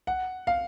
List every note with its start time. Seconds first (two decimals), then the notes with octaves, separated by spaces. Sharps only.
0.07 F#5
0.47 F5